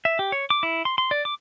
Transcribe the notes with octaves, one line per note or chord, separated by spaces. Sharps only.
E5
G4
C#5
D6
E4
C6
C6
D5
D6